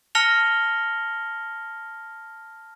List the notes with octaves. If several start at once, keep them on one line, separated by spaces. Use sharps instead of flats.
A5 F6 A#6 C#7 F7 G7